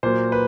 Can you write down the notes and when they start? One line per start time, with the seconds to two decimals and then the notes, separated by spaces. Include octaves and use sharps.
0.03 A#2 F#3 A#3 C5
0.32 B4